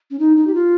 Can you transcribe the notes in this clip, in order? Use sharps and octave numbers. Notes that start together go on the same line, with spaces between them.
C#4
D#4
D#4
G4
F4